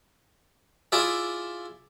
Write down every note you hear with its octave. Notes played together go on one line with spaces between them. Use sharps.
E4 F4 G#4 D5 E5